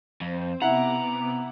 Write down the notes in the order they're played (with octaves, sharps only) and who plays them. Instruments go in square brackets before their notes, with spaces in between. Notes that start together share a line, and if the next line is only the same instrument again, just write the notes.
[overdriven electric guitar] F2 [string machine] C4 C5
[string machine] C3 B3 D6 [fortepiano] E4 F#5 [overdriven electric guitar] A#5